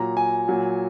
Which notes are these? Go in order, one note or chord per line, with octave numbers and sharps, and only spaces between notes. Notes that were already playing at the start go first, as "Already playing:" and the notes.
Already playing: A#2 F#3 A#5
G#5
A#2 F#3